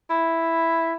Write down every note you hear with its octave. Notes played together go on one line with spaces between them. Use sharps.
E4